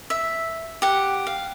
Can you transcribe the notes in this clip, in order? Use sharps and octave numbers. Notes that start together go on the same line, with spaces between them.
E5
G4 F#5
F5